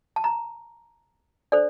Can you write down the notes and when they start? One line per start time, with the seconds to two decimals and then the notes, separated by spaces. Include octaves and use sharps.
0.16 A5
0.24 A#5
1.52 D4 A4 C5 D5